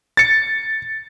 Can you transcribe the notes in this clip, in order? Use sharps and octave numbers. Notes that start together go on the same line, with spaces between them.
A6 C#7